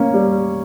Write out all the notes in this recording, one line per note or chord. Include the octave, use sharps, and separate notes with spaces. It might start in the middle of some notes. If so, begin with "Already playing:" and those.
Already playing: A#3 C#4
G3